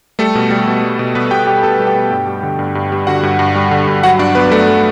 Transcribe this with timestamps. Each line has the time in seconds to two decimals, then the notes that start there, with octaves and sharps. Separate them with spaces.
0.19 G3 A3 A4
0.35 B2
0.50 G3
0.67 B2
0.83 G3
0.99 B2
1.15 G3 B3 B4
1.31 B2 G4 G5
1.47 G3 G4 G5
1.63 B2 A4 A5
1.79 G3
1.87 G4 G5
1.95 B2
2.11 G2
2.27 G3
2.43 D3
2.59 G2
2.75 G2
2.92 G3
3.07 D3 F#4 F#5
3.23 G2
3.39 G2
3.55 G3
3.71 D3
3.87 G2
4.03 F#3 F#4 F#5
4.19 G2 D4 D5
4.35 F#3 B3 B4
4.51 G2 A3 A4
4.68 F#3